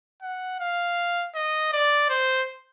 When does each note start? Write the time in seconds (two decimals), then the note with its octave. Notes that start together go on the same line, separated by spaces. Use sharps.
0.22 F#5
0.60 F5
1.35 D#5
1.72 D5
2.10 C5